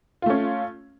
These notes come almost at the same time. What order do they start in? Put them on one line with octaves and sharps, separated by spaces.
F4 A3 C#4